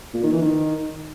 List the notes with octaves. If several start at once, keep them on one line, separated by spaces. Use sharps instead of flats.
A#2
D#3
E3
D#3